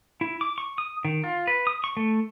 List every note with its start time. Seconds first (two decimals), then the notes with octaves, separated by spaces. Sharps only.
0.21 E4
0.41 D6
0.58 C#6
0.78 D#6
1.05 D#3
1.24 F4
1.47 B4
1.67 D#6
1.84 C#6
1.97 A3